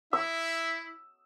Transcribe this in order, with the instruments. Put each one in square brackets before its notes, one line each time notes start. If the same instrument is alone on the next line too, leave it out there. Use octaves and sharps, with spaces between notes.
[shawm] E4 [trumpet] E5 [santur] E6